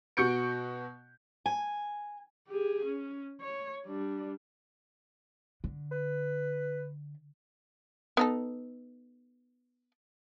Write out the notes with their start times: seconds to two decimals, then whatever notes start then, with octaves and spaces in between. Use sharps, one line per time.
0.17 B2 F#4 C#6 G6 C#7 D7
1.46 G#5
2.48 G4 G#4
2.85 C#4
3.41 C#5
3.86 G3 D4
5.64 D3
5.91 B4
8.17 B3 D#4 A4